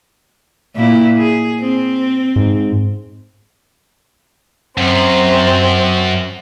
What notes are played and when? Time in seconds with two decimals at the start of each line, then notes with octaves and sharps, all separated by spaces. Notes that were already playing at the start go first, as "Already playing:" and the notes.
0.76 A#2 A#3 E4
1.18 G#4
1.60 C4
2.36 G#2
4.78 F#2 C4